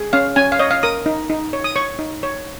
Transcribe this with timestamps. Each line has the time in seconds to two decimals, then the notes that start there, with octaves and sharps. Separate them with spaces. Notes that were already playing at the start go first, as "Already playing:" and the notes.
Already playing: G#4
0.13 C#4 F5
0.36 C#4 G#5
0.52 F5
0.59 C#5 D#5
0.71 F5
0.83 A#4 D#6
1.06 D#4
1.30 D#4
1.53 C#5
1.64 D#6
1.76 C#5 C#6
1.99 D#4
2.23 C#5